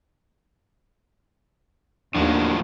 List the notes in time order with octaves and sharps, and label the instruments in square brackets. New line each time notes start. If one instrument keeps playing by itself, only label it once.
[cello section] D#2 [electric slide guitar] A2 F3 F#3 [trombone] D4